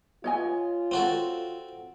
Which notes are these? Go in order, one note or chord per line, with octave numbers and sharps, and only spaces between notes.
F4 C#5 D#5 G#5
C4 F#4 A4